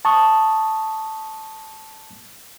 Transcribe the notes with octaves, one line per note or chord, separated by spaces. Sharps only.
A5 C#6 D#6